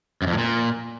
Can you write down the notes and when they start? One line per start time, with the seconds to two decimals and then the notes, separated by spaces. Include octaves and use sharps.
0.22 F#2
0.27 F2
0.33 A2
0.38 A#2